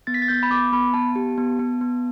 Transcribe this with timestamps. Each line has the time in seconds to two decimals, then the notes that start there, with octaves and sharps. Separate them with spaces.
0.07 B3 A6
0.14 B6
0.22 A6
0.28 B3 G6
0.43 B5
0.50 B3 D6
0.72 B3 B5
0.94 B3 A5
1.16 G4
1.38 B3
1.59 B3
1.81 B3